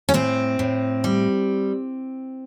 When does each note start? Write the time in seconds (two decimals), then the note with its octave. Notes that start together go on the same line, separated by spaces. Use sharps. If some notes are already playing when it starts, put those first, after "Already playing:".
0.09 C#4
0.14 A2 C4
0.59 A2
1.04 G3